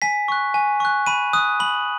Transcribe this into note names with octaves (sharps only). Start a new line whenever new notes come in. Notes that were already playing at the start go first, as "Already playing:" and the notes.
G#5 B6
C#6 F#6
G#5
C#6 F#6
B5 D#7
D#6 F#6
B5 F#7